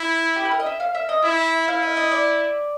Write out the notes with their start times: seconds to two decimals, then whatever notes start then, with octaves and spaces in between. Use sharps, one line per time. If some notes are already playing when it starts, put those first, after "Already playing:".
Already playing: E4
0.36 G4
0.45 B4
0.51 A#4
0.60 D#5
0.66 E5
0.80 F5
0.95 E5
1.09 D#5
1.22 E4 E5
1.68 E4 F5
1.82 D#5
1.97 D#5
2.12 D5